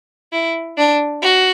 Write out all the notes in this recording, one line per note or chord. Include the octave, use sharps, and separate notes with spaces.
E4
D4
F#4